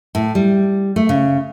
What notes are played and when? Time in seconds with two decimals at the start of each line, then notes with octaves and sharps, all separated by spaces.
0.15 A2
0.35 G3
0.96 A3
1.09 C#3